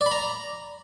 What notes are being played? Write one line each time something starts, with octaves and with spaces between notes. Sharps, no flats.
D5
B5
A#5